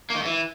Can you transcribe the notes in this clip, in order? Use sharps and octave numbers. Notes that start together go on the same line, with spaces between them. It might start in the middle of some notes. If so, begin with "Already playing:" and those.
A#3
D#3
G#2
E3